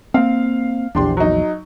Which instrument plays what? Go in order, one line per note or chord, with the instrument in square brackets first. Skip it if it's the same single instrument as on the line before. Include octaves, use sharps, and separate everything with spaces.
[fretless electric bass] A#3 C4 [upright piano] F5
[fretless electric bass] A#1 E2 [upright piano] D4 G4 C6
[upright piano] F#3 D#4